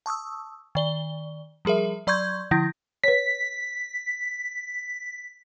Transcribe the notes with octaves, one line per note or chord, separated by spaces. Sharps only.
A5 C#6 D#6 E6
D#3 D5 G7
F3 G3 G#4 A#4 E5
F#3 D5 C6 C#6 G6 G#6
D3 F3 E4 G6 A#6
B4 C#5 B6